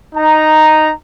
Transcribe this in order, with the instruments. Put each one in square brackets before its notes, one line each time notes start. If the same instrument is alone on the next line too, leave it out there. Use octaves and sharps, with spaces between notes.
[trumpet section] D#4 A#5